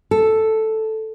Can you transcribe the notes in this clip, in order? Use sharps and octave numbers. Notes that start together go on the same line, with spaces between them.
A4